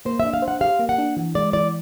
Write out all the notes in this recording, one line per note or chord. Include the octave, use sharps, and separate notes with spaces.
A#3 C5
D4 E5
F5
C5
F#5
G4 F5
A#3
F#5
D4
E3
G#3 D5
E3 D5